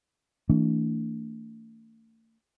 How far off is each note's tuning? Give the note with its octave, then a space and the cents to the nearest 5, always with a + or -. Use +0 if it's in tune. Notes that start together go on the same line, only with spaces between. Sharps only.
E3 -20 A3 +40 D4 -30